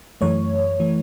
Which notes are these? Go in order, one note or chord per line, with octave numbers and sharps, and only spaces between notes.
F#2 E3 A3 C#5
E3 A3